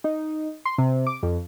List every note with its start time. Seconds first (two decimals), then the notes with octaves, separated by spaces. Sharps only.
0.04 D#4
0.65 C6
0.78 C3
1.07 D6
1.23 F2